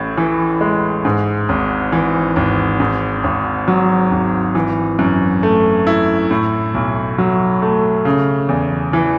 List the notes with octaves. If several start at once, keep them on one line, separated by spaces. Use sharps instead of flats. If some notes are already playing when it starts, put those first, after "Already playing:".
Already playing: A1 A2
E3
G#3
G#2
G#1
E3
G#1
G#2
G#1
F#3
G#1
E3
F#2
A3
E4
A2
B1
F#3
A3
C#3
E2
E3